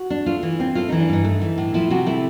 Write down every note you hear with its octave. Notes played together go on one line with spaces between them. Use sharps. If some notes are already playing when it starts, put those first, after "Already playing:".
Already playing: F#4
D4
A3 F4
E3
C4
A3 F4
E3 D#4
D4
G2 D#4
A3
E3
A2
F3 E4
C3 F#4
A3 E4